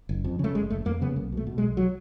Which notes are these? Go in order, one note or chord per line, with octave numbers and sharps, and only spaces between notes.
F#1
F2
C#3 A3
F#1 G#3
F#1 A3
F2 A#3
C#3 B3
B1 A#3
B2 A3
B2
G#3
B1
F#3